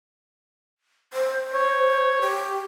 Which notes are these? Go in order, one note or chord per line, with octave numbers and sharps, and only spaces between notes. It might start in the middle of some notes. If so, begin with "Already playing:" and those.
C5
C#5
G4